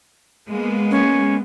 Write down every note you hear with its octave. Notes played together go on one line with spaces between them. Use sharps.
G#3 A#3 B3
C#4